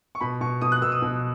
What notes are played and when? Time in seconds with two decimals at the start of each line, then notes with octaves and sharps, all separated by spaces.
0.15 C#6
0.21 B2 B5
0.41 B2 C#6
0.61 B2 D#6
0.72 F#6
0.82 B2 E6
0.92 D#6
1.02 B2